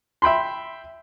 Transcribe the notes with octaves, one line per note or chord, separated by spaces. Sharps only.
E5 G5 B5 C6